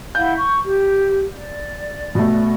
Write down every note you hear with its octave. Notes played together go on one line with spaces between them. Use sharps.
E4 F5 F#5 G6
C#6
G4
D5
B2 A3